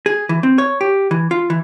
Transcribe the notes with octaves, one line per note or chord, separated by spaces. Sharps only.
G#4
E3
C4
C#5
G4
E3
F4
E3